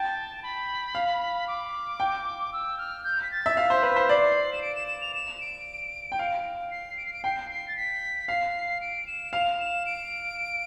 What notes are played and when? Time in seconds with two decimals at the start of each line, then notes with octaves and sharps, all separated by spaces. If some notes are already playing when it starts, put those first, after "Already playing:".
Already playing: G5 A5
0.43 B5
0.95 F5
1.47 D6
2.00 G5
2.53 E6
2.78 F6
3.04 G6
3.22 B6
3.31 A6
3.46 E5
3.57 F5 B6
3.70 C5
3.83 B4
3.96 C5
4.09 D5 C7
4.53 E7
4.62 D7
4.75 E7
4.88 E7
5.01 F7
5.14 E7
5.41 D7
6.12 G5
6.19 F5
6.71 C7
6.97 D7
7.06 C7
7.13 D7
7.24 G5 C7
7.50 C7
7.68 A6
7.76 B6
8.28 F5 C7
8.81 D7
9.07 E7
9.33 F5 F7
9.59 E7
9.86 D7